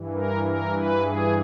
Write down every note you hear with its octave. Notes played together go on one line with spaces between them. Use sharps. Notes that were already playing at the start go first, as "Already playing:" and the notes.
Already playing: G2 E3
A#4
A#4
B4
G#4